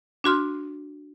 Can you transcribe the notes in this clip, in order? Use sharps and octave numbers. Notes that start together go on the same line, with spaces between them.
D4 F#4 C6 F6